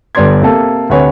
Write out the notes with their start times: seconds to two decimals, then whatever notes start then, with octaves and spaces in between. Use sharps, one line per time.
0.15 G1 G3 B3 D5 C6 G#6
0.42 C3 A#3 A4
0.90 D2 C3 B4 C#5 G#5